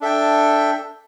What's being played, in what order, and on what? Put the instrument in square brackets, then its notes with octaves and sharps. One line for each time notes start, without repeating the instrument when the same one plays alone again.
[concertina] D4 A4 E5 G5